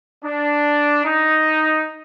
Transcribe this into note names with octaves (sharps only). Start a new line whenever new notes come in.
D4
D#4